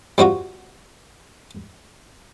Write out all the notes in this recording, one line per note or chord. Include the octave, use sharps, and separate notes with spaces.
G3 C4 F4 F#4